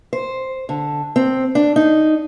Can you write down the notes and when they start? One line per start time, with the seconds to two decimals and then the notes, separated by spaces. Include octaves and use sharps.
0.13 C5
0.69 D3
1.16 C4
1.55 D4
1.76 D#4